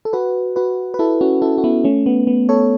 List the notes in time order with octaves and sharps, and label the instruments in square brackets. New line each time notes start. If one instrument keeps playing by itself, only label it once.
[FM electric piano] A4
F#4 B4
F#4 B4
B4
E4 A4
C#4 F#4
E4 A4
F#4
B3 E4
A3 C#4
B3
B3
A4 C#5